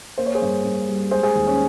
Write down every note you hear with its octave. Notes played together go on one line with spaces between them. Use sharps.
A#3 C5
C#5
G#4 C5
G2
G2
G3
G#3 G#4 C5
G#4 C5
D#2
C#4